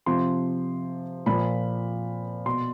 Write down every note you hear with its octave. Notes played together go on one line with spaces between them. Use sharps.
C3 F3 C6
A#2 F3 B5
B2 C6